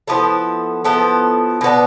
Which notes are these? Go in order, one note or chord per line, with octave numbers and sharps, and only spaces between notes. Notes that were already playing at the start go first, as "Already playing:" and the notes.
F3 B3 E4 A4
F3 B3 E4 A4
B2 B3 D4